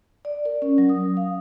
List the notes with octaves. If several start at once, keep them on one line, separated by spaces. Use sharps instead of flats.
D5
A#4
C#4
F#3
D#6
F5